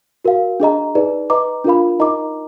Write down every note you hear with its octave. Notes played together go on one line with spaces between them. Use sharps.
F#4 A#4 F5
D4 G#4 D#5 A#5
D#4 G#4 B4 D5
B4 D#5 A#5 D6
D4 F4 A#4 F5 B5
D#4 A#4 D#5 A#5 D6